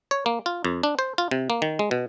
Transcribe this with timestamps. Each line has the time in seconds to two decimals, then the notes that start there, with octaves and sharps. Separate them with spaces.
0.11 C#5
0.26 A#3
0.46 F4
0.65 F2
0.83 D4
0.99 C5
1.18 F4
1.31 C3
1.50 A#3
1.62 D#3
1.79 G#3
1.91 B2